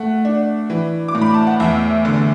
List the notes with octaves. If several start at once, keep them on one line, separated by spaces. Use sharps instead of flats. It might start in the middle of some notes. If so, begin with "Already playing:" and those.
Already playing: A3 F#5
D4
E3
D6
A2
B5
A5
F#5
E2 E5
D3